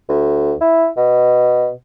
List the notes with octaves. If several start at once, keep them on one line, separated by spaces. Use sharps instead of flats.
D2
E4
B2